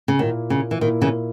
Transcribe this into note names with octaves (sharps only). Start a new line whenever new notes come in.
C#3
A#2 D#3 A#3 E4
C#3
E3
A#2 D#3 A#3 E4
C#3 E3